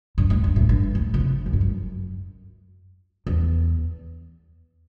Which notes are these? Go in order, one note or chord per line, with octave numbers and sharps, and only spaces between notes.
G2
A2
G2
A2
G2
A2
B2
C3
F#2
G2
F#2
E2